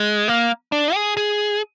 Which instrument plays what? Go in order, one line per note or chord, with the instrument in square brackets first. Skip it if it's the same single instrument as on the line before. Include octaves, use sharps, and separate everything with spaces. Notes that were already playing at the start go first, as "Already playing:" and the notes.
Already playing: [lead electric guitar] G#3
A#3
D4
G#4
G#4